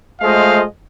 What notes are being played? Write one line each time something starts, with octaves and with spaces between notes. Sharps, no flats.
G#3 A3 F4 C5 D#5 F5